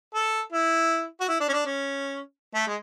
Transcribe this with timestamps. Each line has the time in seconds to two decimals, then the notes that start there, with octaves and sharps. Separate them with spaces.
0.14 A4
0.52 E4
1.21 F#4
1.28 E4
1.40 D4
1.49 C#4
1.53 D4
1.66 C#4
2.55 A3
2.67 G#3